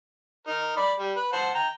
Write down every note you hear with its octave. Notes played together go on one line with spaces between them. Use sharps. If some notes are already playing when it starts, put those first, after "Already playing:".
D#4 A#4
D5 B5
G3
B4
C5 F#5 A5
G5 A#5